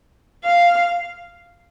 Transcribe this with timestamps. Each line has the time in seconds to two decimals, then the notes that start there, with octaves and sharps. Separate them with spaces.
0.45 F5